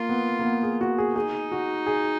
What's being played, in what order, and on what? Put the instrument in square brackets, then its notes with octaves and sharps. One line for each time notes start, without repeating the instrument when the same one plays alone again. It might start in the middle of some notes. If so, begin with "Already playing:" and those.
Already playing: [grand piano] A#3 [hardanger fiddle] F4
[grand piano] B3
A#3
B3
G#4
F#4
G#4
[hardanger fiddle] D#4 [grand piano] G#4
[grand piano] F#4
G#4